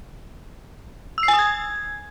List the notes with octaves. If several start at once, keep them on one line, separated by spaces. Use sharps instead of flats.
E6
C7
G#5
D#6
G#6